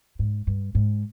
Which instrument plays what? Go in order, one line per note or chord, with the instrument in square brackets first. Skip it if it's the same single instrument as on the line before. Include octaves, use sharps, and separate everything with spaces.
[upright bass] G#2
G2
G#2